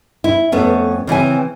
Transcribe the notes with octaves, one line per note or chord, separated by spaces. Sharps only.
E4
F2 A3 B3 C#4
C#3 E3 C4 G#5